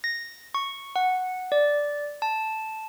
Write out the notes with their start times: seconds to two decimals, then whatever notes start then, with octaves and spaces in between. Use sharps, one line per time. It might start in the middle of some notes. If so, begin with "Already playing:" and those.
0.04 A#6
0.55 C#6
0.96 F#5
1.52 D5
2.22 A5